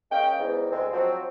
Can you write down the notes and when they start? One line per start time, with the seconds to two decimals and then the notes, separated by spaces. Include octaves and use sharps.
0.11 G#3 A#3 C#4 F5 G5
0.39 E2 G#2
0.72 D2 G#3 C4
0.92 G#2 F3 F#3 C4